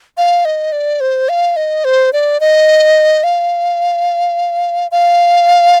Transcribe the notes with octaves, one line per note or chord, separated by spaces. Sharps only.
F5
D#5
D5
C5
F5
D#5
C5
D5
D#5
F5
F5